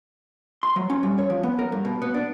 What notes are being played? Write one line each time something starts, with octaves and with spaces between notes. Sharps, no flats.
C6
F#3
C#4
G3
C#5
F3
B3
A#4
G2
B2
B3
D4